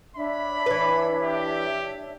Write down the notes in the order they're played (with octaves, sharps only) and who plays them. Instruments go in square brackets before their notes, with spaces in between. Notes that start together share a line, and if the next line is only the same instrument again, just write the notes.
[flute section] D4 C#5 E5 [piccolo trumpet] B5
[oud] E3 B4
[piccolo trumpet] G4